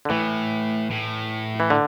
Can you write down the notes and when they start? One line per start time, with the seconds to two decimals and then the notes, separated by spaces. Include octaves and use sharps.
0.05 D3
0.10 A2 E3
0.91 A2
1.60 E3
1.70 D3